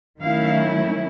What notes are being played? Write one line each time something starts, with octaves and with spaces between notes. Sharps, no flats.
D#3 F#3 A3 C#4 E4 F5